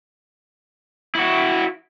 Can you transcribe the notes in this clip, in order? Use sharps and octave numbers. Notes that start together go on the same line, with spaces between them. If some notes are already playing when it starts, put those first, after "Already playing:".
E4 F#4